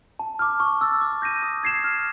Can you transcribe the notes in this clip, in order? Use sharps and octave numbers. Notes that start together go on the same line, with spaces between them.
A5
D6 F6
C#6
E6 A6
D6
G6 A#6 D#7
D#6
G#6 C7 E7
F6